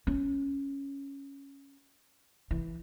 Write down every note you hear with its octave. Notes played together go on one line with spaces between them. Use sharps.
C#4
E3